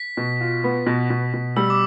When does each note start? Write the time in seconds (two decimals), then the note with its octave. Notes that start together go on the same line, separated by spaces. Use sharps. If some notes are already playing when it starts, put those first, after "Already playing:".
Already playing: B6
0.17 B2
0.41 F4
0.64 B3
0.87 B2
1.10 B2
1.34 B2
1.56 G3 E6
1.70 D6